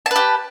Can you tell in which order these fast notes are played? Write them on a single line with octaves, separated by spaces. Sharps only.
A5 B4 G4